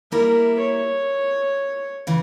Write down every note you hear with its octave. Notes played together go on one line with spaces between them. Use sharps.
G3 A#3 E4 A#4
C#5
C#3 E3